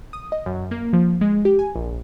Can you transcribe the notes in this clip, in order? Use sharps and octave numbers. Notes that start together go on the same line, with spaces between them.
D#6
D#5
F#2
A#3
F3
G#3
G4
G#5
A#1